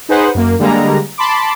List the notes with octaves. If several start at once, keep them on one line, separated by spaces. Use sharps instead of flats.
D#4 G#4 B4 C5 F#5
F#2 A#3
D3 G3 G#3 A#3 A#5
A5 B5 C6 D6